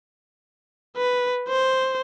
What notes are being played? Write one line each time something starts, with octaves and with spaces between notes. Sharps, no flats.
B4
C5